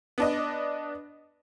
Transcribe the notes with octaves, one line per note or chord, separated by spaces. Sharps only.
B3 D4 D#5